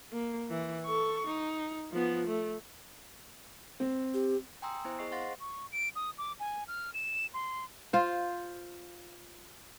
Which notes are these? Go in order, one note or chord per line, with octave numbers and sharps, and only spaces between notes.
A#3
E3
A4 C#6
D#4
F3 B3
A3
C4
G4
G5 G#5 A#5 C6 D#6 E6
B3 E4 C5
G#4 D#5 C#6 C7
C5 F5 F#5 C6 A6 A#6
C#6
D7
D#6
D6
G#5
F6
E7
C6
F4 C5